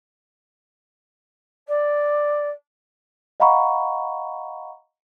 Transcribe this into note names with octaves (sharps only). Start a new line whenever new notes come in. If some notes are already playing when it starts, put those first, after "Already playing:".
D5
D#5 F5 F#5 A#5 B5 C#6